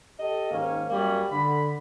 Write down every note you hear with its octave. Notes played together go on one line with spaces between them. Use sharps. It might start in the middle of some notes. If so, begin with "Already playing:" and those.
G4 A4 D#5
G#2 D#3 A#3 C#4
F#2 G3 A#3 C#4
D3 B5